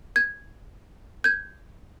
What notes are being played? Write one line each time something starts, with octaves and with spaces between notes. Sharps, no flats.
G#6
G6 G#6